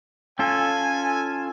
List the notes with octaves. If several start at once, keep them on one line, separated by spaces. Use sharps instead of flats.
C#4 F4 A4 G#5